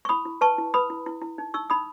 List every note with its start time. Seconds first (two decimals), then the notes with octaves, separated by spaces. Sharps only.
0.05 C#6
0.09 E4 B5 D#6
0.25 E4
0.41 B4 A5 C#6
0.58 E4
0.74 B4 B5 D#6
0.90 E4
1.06 E4
1.21 E4
1.38 D#4
1.54 D#4 C#6 E6
1.70 D#4 B5 D#6